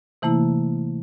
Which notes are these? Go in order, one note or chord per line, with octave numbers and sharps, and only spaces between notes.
C3 E3 A3 A#3 E4